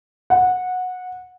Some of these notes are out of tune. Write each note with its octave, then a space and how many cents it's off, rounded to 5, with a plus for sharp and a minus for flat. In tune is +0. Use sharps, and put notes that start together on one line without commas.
F#5 -15